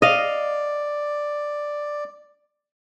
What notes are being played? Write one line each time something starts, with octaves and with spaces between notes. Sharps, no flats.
D5 D#5 F5